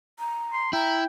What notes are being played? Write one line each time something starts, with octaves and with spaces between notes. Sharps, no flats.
A#5
C6
E4 G5 A#5